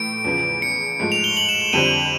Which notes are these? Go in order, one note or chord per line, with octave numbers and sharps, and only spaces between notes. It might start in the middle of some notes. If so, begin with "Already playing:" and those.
Already playing: A2 E3 A3 D7
E2 C#3 F3
C#7
G#2 F3 A3
F7
G7
F#7
E7
E7
F2 D3 G3 C4 D#7